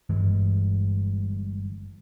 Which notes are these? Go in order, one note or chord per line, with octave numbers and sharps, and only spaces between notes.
G1 G2 E3 G#3